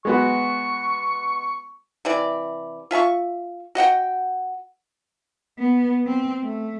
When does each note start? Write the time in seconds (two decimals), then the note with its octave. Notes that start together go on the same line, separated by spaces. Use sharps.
0.05 G#3 B3 F#4 C#6
2.05 C3 E3 D5
2.91 F4 E5 G#5 C#6
3.75 F#4 D#5 F#5 G5
5.59 B3
6.06 C4
6.44 A3